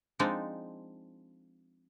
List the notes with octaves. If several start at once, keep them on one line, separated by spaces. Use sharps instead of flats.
F3 G#3 C4 D4 D#4